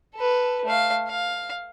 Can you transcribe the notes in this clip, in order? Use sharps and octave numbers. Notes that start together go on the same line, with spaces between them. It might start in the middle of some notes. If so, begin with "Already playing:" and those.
A4 B4
A3 F5
F5